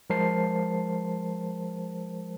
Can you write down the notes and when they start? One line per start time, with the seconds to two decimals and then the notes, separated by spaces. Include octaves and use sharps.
0.10 F3 G#3 A#4 C5 A5 C7